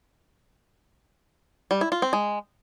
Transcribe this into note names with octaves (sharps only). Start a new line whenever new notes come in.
G3
E4
F4
C4
G#3